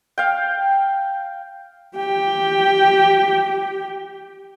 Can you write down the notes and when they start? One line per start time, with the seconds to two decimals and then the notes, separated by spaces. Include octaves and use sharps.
0.18 F5 G5
1.96 G4 G5